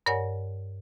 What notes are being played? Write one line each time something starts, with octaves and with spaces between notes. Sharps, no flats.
G2 A#4 C#5 D5 F#5 G#5